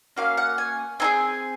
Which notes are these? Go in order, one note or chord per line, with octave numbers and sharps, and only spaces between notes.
A#3 C#4 F#4 F5
F#5
G#5
C4 D#4 G#4 G#5